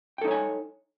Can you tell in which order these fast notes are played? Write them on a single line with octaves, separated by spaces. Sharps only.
G5 A4 D#4 C#5 G#5